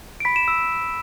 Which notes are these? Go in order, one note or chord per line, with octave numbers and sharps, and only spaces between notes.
D7
B5 B6
E7
E6